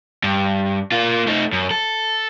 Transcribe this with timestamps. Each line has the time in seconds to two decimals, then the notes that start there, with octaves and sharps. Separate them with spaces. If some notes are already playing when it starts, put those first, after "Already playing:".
0.24 G2
0.92 A#3 F4
1.27 A3 D#4
1.53 F#2
1.71 A4